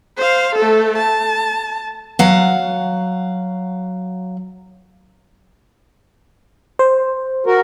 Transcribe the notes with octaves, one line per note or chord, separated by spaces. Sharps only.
C5 F5
A3 A4
A5
F#3 F5 F#5
C5
F#4 A#4